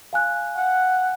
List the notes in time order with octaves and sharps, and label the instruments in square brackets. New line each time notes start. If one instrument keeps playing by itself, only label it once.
[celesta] F5 G#5 F#6
[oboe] F#5